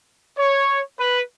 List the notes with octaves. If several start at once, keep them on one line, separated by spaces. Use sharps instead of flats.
C#5
B4